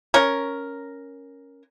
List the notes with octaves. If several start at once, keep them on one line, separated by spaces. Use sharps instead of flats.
C#4 A#4